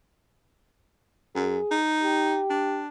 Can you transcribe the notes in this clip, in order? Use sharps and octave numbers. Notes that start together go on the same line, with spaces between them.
F#2 G#4
D#4
G4
D4